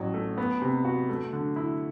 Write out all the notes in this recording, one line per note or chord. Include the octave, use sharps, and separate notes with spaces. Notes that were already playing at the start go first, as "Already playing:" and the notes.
Already playing: A1 F#3
A3
B3
C3
F#4
A3
D3
E4